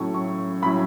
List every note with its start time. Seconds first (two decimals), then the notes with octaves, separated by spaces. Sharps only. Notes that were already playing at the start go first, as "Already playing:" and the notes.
Already playing: A2 F#3 A3 C#4 E4 C#6
0.14 C#6
0.62 A2 F#3 C#4 E4 B5